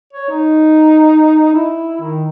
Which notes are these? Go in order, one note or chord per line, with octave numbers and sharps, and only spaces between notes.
C#5
D#4
E4
D#3